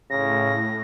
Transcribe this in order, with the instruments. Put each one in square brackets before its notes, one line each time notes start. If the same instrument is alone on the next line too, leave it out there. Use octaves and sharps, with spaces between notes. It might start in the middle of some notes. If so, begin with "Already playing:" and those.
[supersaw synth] A2 [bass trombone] C#3 [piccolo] A#6